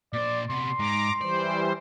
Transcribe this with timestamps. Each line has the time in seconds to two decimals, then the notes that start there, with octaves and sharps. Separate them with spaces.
0.13 A#2 C5 D5
0.50 C3 B3 C6
0.79 G#2 A#5 D6
1.21 E3 G3 C5 D5